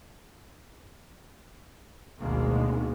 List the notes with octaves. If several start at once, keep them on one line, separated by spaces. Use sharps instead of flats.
G#1 D2 B2 D#3 G#3 A#3